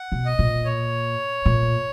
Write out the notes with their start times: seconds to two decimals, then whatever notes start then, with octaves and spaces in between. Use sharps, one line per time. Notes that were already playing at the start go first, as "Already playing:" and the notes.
Already playing: F#5
0.12 B2
0.26 D#5
0.39 A#2
0.65 C#5
1.46 A#2